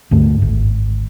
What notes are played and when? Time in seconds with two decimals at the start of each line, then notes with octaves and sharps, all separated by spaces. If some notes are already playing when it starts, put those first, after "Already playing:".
0.11 D2 G2 A3
0.42 G#1